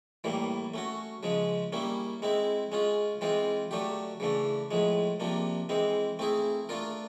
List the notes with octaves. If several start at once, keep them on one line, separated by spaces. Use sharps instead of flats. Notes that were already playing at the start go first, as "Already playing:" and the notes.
A2 E3 G3 A#3
A3 C#4 F#4
C#3 F3 G#3
G3 A#3 C#4 E4
G#3 C4 E4
G#3 C#4 F4
E3 G#3 C4 F4
D3 F#3 A3 D4 G4
C#3 E3 A3 D4
A2 F3 G#3
C3 F3 A#3 D4
E3 G#3 C4
A3 C4 E4 G#4
A3 D4 F4 A#4